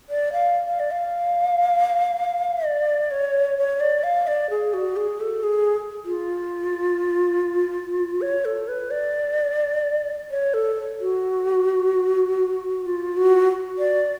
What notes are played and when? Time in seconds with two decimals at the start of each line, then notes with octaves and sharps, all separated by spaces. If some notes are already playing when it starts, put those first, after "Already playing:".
0.10 D5
0.33 F5
0.67 F5
0.80 D5
0.91 F5
2.65 D5
3.11 C#5
3.58 C#5
3.80 D5
4.04 F5
4.27 D5
4.50 G#4
4.74 F#4
4.96 G#4
5.20 A4
5.43 G#4
6.05 F4
8.21 C#5
8.45 A4
8.68 B4
8.91 D5
10.31 C#5
10.54 A4
11.01 F#4
12.86 F4
13.17 F#4
13.79 D5